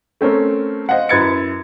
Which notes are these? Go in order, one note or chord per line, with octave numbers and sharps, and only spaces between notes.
A3 C4 C#4 A#4
C5 D#5 F5 F#5
F#2 E4 B4 G#6 A6 C#7